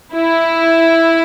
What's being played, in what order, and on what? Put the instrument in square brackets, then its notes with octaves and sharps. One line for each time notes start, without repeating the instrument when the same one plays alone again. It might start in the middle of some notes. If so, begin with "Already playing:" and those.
[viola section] E4